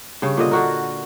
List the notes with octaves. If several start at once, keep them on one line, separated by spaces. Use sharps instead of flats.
G2 C#3
A#2 D3 D#5
D3 F#4 A#4